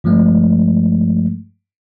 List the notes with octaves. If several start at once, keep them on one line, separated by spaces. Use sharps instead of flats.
G2 F3 G#3 A3